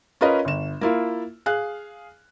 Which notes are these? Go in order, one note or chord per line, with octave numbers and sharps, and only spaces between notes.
C#4 F4 A#4 B4 D#5
G1 E7
A#3 E4 F4
G#4 F5 F#6